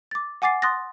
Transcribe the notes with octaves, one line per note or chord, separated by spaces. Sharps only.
D6 A6
F#5 G#5 D6 A6 C7
C6 D#6 F#6 A6 A#6